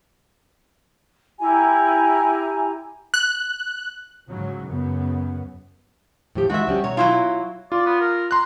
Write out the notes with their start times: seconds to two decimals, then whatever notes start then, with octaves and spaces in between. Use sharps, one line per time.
1.39 E4 G4 G#5 A#5
3.14 F#6
4.29 G#2 C#3 F#3
4.67 F#2 C#3 B3
6.35 A2 F3 G4
6.50 E3 G#3 D#4 F#4 E5
6.67 F3 G3 C#4
6.84 B2 C#5 A#5
6.97 F#3 E4 F4
7.72 F4 D5
7.86 B3
8.00 A#4
8.31 A#5 C6 F#6